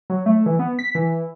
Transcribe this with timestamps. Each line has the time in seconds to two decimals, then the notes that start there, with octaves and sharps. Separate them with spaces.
0.10 F#3
0.26 A3
0.46 E3
0.59 B3
0.79 B6
0.95 E3